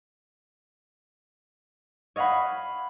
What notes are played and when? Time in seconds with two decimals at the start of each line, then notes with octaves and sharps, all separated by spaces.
2.16 C#5 D#5 F5 F#5 B5